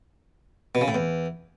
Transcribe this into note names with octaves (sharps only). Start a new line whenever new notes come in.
B2
C#3
A2
E2